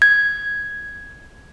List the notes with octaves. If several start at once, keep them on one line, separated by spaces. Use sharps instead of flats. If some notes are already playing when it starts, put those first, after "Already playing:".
G#6